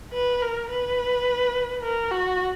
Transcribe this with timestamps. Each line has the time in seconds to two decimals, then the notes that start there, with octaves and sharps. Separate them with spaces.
0.14 B4
0.42 A#4
0.70 B4
1.83 A#4
2.11 F#4